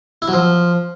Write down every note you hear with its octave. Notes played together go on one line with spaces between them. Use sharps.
E4
F#3
F3